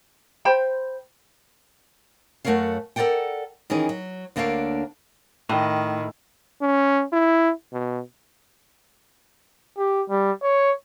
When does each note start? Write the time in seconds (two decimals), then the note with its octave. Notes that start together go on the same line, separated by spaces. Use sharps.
0.45 C5 G5 B5
2.45 F#2 A3 F#4 A#4 C#5 F5
2.96 A4 A#4 C#5 D5 F#5 G5
3.70 D#3 E3 C#4 G#4
3.89 F#3
4.36 D2 A#3 D4 A4 C#5 F5
5.49 A2 D#3
6.62 C#4
7.13 E4
7.73 B2
9.77 G4
10.09 G3
10.42 C#5